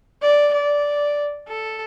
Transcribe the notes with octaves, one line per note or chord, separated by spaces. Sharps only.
D5
D5
A4